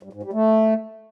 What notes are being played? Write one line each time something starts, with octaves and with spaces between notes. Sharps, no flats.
G2
G#2
G3
A3